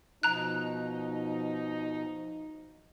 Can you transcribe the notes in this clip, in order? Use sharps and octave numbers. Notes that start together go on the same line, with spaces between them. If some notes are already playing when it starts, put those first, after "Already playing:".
B2 F3 D#4 A#5 F#6